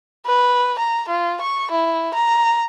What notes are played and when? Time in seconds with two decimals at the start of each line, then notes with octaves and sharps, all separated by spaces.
0.26 B4
0.78 A#5
1.08 F4
1.41 C#6
1.71 E4
2.14 A#5